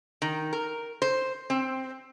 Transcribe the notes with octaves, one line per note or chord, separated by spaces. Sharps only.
D#3
A#4
C5
C4